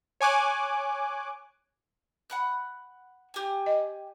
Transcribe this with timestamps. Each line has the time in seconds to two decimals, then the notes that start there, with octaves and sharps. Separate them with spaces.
0.21 C#5 G#5 D6 F#6
2.30 F#5 B5 F#6
3.34 G4 G#5
3.66 D#5